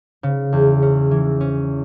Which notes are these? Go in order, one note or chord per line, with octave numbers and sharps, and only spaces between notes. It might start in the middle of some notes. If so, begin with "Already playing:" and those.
C#3
E2
C#4
E3
C#4